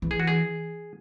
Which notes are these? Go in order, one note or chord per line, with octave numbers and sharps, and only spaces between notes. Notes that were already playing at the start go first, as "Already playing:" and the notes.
E3
G#4
F#4
G#4